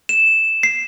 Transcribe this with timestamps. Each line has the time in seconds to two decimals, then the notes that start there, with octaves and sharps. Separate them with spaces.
0.09 E7
0.63 C7